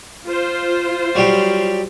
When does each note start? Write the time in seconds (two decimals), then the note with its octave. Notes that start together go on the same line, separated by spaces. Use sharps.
0.25 F4 C5
1.15 F#3 G3 G4